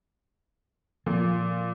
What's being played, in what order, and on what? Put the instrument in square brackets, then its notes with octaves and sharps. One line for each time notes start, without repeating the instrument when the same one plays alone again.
[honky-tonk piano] A#2 [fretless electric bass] F3